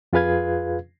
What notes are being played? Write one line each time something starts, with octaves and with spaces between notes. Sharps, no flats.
F2 F4 G#4 B4 F5 G#6